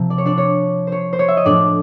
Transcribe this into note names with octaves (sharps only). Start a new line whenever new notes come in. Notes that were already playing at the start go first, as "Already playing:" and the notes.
Already playing: C3 F3
D5
C#5
D4 D5
C#5
C5 C#5
C5
C#5
E5
D#5
A2 F3 D4 D5